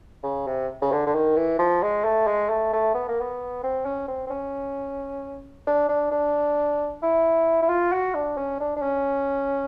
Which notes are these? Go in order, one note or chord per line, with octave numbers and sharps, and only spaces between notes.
C#3
C3
C#3
D3
D3
D#3
E3
F3
G#3
A3
G#3
A3
A3
B3
A#3
B3
C4
C#4
C4
C4
C#4
D4
D4
D4
E4
E4
F4
F#4
D4
C#4
D4
D4
C#4